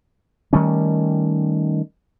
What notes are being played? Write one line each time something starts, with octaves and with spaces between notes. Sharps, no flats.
D#3 G3 A3 C#4